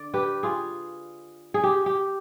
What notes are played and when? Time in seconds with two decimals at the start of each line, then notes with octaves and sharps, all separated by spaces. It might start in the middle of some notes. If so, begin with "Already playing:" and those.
Already playing: D3 D5
0.14 G4 B4
0.43 F4 G#4
1.54 G#4
1.64 G4
1.86 G4